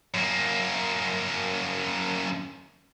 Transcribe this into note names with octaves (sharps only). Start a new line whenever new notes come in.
F#2 A#3